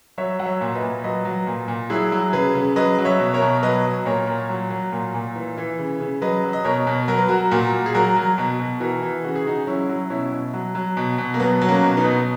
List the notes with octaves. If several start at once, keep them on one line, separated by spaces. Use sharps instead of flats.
F#3 C#5 E5
F#3 F#5
C#5 E5
A#2
B4 D#5
A#2
F#3 B4 D#5
F#3
A#2
A#2
F#3 E4 G#4
F#3
C#3 G#4 B4
C#3
F#3 B4 D#5
F#3
C#5 E5
B2
A#4 C#5
B2
F#3 B4 D#5
F#3
A#2 A#4 C#5
A#2
F#3
F#3
A#2
A#2
E3
E3
C#3
C#3
F#3 B4 D#5
F#3
D#5
B2 A#4 C#5
B2
F#3 A#4
B4
F#3 F#4 A#4
A#2 F#4 A#4
A#2
G#4
F#3 F#4 A#4
F#3
B2
B2
E3 F#4 A#4
E3
C#3 F#4
G#4
C#3 D#4 F#4
F#3 C#4 E4
F#3
B2 C#4 E4
B2
F#3
F#3
B2
B2
A#3
F#3 B3
F#3
A#3 C#4
B2
B3 D#4
B2